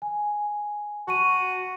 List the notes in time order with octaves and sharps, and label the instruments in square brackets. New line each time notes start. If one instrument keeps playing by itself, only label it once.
[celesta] G#5
[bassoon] F#4 [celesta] A5 C#6 D#7